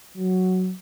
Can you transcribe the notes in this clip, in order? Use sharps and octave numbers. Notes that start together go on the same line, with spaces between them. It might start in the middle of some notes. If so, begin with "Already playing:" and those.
F#3